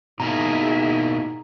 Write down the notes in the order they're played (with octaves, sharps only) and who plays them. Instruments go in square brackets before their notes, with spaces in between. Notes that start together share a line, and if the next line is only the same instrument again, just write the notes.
[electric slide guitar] B2 A#3 E4 [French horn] D#4 [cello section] G#4 E5 [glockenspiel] A#5